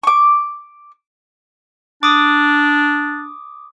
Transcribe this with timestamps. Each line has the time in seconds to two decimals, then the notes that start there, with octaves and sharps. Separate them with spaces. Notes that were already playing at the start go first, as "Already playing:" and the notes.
0.03 C#6 D6
2.03 D4 D6 D#6